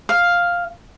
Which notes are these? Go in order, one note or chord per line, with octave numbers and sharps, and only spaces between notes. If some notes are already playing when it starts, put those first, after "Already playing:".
F5